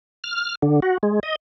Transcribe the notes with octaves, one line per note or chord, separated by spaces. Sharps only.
F6
D3
F#4
G#3
D#5